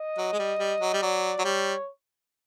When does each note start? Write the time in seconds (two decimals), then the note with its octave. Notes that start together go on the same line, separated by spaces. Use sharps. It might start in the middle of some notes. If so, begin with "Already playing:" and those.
Already playing: D#5
0.18 F#3
0.33 G#3
0.39 G3
0.59 G3
0.80 F#3
0.94 G3
1.02 F#3 D5
1.39 F#3
1.44 G3 C#5